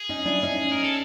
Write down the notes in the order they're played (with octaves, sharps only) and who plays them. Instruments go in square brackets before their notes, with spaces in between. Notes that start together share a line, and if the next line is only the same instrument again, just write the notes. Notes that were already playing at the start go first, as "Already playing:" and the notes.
Already playing: [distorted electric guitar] G#4
[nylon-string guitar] C#4 D#4
D4 E4
C#4 D#4
[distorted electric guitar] A#4
A4